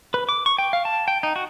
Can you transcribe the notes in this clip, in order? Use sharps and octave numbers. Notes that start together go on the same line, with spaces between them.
B4
D6
C#6
G5
F5
A5
G5
D#4
F#4